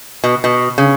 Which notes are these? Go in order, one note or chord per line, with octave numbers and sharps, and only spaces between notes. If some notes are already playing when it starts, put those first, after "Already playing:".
B2
B2
C#3